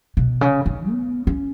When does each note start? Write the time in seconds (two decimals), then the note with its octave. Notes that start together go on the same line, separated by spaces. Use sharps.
0.17 B2
0.41 C#3
0.66 D#3
0.90 B3
1.27 C#4